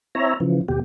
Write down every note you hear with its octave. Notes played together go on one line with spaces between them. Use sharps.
C4 E4 C#5 E5 A#5
C#3 E3 F3
D#2 B2 G4